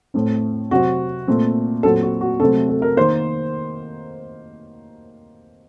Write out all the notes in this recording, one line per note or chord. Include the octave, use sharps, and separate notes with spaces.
A2 A3 C4
C3 F#3 C4 F#4
A#2 A3 C4
A#2 F#3 C4 A4
F#4
F#4
C3 F#3 A3 C4 A4
A4
A#4
D#3 A#3 C5